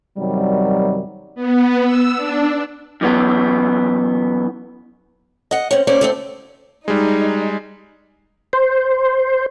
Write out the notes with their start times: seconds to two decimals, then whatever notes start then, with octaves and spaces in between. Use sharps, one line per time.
0.18 F#2 C3 D#3 F#3 G3
1.35 B3
1.84 E6
2.16 D4
3.01 F#2 E3 B3
5.51 D#5 F#5
5.71 C4 C#4
5.87 A#3 C#4 C5 D5
6.01 D#2 A3 C4
6.88 G3 G#3 D#4
8.53 C5